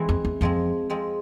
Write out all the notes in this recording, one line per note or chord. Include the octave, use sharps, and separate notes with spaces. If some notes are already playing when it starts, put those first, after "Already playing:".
Already playing: E3 G#3 C4 E4
F2
E2
F2 F3 G#3 C4
F3 G#3 C4